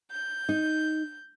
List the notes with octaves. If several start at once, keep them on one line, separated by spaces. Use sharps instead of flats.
G6
D#4